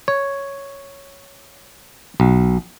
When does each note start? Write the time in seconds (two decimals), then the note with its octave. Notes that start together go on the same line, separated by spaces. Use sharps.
0.08 C#5
2.20 B1